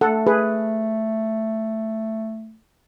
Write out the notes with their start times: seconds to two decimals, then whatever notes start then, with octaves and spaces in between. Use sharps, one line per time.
0.01 A3 A4 F#5
0.27 G#4 B4